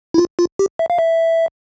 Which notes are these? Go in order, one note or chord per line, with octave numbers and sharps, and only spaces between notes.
E4
F4
F4
G4
E5
F5
E5